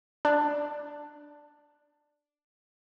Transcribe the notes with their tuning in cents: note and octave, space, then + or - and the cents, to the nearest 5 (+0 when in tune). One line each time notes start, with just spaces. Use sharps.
D4 +15 D5 +0